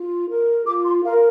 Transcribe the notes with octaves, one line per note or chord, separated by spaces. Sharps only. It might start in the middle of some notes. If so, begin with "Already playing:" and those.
Already playing: F4
A#4
F4 D6
C6
A#4 F5